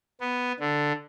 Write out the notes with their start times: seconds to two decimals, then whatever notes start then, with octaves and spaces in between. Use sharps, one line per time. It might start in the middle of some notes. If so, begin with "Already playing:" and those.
0.21 B3
0.60 D3